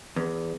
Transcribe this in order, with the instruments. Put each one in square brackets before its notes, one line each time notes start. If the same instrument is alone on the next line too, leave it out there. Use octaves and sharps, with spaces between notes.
[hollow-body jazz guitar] E2